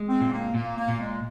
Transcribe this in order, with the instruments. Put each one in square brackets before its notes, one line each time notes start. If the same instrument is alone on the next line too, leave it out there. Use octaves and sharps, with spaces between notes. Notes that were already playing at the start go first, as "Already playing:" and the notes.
Already playing: [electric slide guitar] G#3
[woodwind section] C4
[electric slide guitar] A#2
[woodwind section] A#3
[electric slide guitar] A#2 [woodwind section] A#3
[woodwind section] A#3
[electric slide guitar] A#2
[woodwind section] G#3